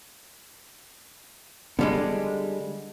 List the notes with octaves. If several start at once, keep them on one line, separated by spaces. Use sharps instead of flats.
D3 G3 G#3 B3